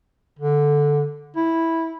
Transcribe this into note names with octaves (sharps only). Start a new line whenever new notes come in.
D3
E4